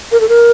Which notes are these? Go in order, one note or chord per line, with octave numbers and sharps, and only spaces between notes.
A#4
A4
A#4